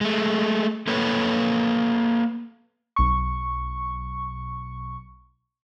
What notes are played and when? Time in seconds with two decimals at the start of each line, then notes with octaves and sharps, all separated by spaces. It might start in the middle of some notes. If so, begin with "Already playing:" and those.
0.01 G#3 A3
0.87 A#3 A4 B4 C#5
2.96 B1 C#6